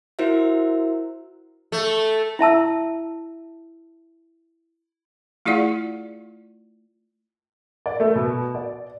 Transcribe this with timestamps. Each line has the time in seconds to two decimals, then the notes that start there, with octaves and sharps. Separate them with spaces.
0.19 E4 F#4 A#4 C5 E5
1.72 A3
2.39 E4 E5 A5 E6
5.46 A3 E4 F4 G#4 D5 F#5
7.86 D5
8.00 A3
8.15 B2
8.55 D5